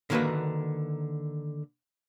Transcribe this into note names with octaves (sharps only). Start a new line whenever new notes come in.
D3 D#3 A#3 F#4 A#4 B4